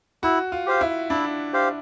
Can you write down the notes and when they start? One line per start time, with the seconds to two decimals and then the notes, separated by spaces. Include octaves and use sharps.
0.23 E4 F#4
0.52 F4
0.66 G4 C5 F5
0.81 E4
1.10 D4 E4
1.53 G4 C5 F5